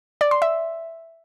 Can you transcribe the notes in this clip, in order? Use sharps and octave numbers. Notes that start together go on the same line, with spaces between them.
D5
C6
E5